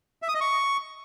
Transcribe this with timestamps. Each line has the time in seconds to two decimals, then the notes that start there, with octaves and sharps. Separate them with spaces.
0.22 E5
0.28 D#6
0.35 D#5
0.41 C#6